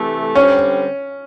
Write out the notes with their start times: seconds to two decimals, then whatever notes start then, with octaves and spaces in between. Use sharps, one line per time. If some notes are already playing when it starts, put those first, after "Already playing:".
Already playing: C3 E3 A3
0.35 D3 G3 C4 C#4